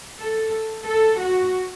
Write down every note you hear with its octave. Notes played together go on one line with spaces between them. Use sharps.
A4
A4
F#4